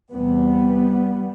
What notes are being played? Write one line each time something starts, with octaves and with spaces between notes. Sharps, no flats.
E2 C3 G3 B3